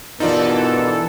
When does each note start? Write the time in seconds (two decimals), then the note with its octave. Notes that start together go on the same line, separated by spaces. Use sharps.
0.20 G2 B2 E3 D#4 F4 A4 A#4 D5